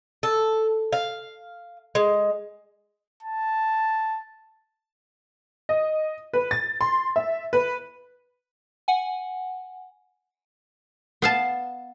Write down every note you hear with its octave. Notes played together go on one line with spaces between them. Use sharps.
A4
F5
G#3
A5
D#5
B4
A6
C6
E5
B4
F#5 G#5
B3 F5 A5